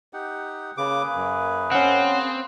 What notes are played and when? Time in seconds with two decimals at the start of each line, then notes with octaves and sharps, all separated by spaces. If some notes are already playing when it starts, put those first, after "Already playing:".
0.13 D#4 G4 F#5
0.78 C#3 A#3 G#4 B4 D6
1.15 F#2
1.71 C4 C#4 F#5